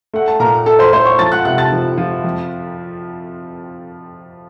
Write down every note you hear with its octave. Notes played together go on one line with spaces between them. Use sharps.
A3 F#5
A5
A#2 A#4 A#5
A3 A4 A5
C5 C6
A3 C5 C6
C#5 C#6
F3 A5 A6
F#5 F#6
C3 F#5 F#6
A5 A6
F3
F3
F2